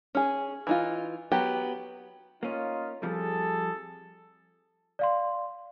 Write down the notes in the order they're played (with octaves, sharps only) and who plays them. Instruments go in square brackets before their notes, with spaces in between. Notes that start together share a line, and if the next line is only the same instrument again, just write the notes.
[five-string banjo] C#4 G#4
E3 D#4 F4
F#3 B3 G4
[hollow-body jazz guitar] A#3 C#4 [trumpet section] D#4 F4
[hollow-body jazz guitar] F2 F3 G3 [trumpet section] G#4 A4
[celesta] D5 F5 C6